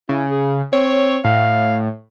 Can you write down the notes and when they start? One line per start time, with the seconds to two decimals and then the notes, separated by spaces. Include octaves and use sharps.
0.09 C#3 E4
0.30 G#4
0.73 C4 C#5
1.24 A2 F5